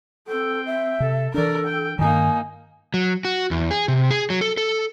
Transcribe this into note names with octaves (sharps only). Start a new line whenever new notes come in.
C4 A4 G5
E5
C3 A4
E3 D4 A4 A#4 D5
G5
G2 D#3 A#3 D#4 G#5
F#3
F#4
E2
G#4
C3
G#4
F#3
A4
A4